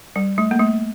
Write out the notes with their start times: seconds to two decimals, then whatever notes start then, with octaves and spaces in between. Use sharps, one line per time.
0.16 G3
0.38 A3
0.51 A#3
0.60 A3